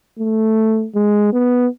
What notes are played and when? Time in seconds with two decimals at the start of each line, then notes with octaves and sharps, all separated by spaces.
0.19 A3
0.95 G#3
1.33 B3